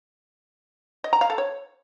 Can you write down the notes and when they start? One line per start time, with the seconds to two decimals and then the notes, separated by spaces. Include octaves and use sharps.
1.04 D#5
1.13 A#5
1.21 F5
1.30 A4
1.38 C#5